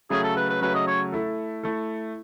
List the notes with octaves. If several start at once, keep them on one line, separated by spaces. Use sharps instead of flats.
C#3 F#3 A3 C#4 G#4
A4
B4
B4
C#3 F#3 A3 C#4 B4
D#5
C#5
A3 E4 A4
A3 E4 A4